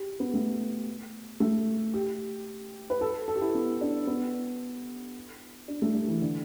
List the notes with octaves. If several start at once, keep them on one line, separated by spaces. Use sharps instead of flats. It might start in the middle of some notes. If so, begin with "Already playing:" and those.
Already playing: G4
B3
A3
A3
G4
B4
A4
A4
G4
E4
B3
D4
B3
D4
A3
G3
E3
D3